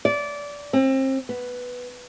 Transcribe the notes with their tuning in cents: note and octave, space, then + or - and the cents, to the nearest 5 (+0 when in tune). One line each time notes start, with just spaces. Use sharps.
D5 -20
C4 +30
B3 +0